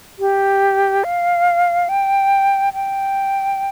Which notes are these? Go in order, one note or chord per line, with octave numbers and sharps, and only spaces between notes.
G4
F5
G5
G5